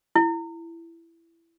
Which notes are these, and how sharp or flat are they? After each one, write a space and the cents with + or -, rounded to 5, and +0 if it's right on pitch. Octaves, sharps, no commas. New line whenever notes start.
E4 +15